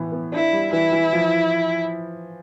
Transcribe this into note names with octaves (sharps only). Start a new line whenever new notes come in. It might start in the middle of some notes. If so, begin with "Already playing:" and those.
Already playing: A2 E3 B3
B3
D4 E4
G3
E3 E4
E3
F3